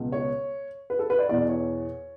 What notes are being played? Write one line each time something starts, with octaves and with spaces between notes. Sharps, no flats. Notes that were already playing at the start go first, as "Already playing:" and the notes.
Already playing: C#2 B2
C#5
B4
A4
B4
D5
E2 B2 D5
C#5